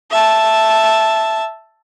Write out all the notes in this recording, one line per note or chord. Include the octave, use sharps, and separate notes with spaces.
E5 A5